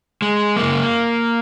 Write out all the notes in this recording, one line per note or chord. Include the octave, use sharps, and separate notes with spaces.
G#3
F#2 C#3 A#3